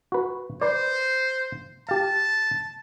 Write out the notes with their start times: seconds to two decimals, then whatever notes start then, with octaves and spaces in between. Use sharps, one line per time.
0.12 F#4 B4
0.61 B4 C5 D5
1.89 G4 F5 A5